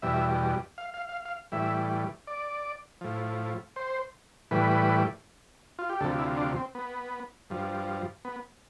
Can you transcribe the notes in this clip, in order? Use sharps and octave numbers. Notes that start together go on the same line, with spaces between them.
E2 B2 G3 E5
F5
F5
F5
F5
A2 E3 G3 E5
D5
A2 F3
C5
A2 E3 G3 B4
F4
G4
D2 C3 F3 A4
E4
D4
C4
B3
G2 F3
B3